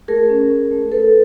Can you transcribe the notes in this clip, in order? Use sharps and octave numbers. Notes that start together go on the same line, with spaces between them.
A3 G#4 A#4
C#4
C#4
A3
A3 A4 B4